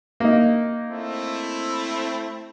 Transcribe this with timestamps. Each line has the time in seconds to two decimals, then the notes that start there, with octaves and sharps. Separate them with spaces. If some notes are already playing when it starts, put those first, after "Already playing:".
0.20 A#3 D#4
0.91 A3 C4 E4